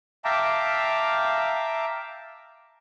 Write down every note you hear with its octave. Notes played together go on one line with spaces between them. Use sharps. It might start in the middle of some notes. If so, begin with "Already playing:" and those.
E5 F5 G5 A5 A#5 D6